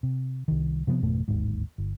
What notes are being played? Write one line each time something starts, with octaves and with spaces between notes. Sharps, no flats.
C3
C2 D#3
C3 F3 F#3 B3
G#1 F2 B2 A3
D1 G#1 D#2 G#2
G1